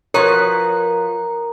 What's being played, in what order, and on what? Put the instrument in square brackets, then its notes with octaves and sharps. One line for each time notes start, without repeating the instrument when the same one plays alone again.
[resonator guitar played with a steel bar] F3 F#4 B4 [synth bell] A#4 A#5 [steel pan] C#5